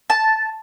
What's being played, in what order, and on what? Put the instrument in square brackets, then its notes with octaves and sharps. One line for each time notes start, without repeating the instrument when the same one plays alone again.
[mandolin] A5